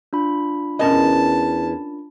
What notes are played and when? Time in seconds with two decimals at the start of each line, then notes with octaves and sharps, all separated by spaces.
0.13 D4 F4 B5
0.79 E2 C#4 A#4 D#5 A5